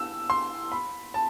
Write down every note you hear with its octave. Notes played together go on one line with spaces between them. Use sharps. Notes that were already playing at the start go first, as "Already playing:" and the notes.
Already playing: E6
C6
B5
A5